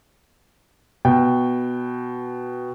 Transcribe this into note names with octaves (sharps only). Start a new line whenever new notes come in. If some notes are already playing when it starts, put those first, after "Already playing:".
B2 G5